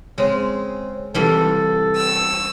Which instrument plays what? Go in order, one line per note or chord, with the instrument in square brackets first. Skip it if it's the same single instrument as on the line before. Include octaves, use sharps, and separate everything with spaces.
[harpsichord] C#3 C4 [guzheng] G#3
[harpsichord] C2 [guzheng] E3 G3 F4 [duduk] A4
[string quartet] E6